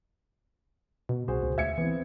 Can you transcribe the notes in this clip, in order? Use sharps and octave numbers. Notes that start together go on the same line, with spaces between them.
B2
C2 F#4 G#4 C5
C#2
D2 E5 G#6 C#7
E3 B3 C4